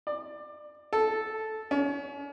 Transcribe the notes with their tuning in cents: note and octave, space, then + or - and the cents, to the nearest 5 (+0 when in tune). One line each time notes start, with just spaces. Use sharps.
D5 +20
A4 -5
C#4 +35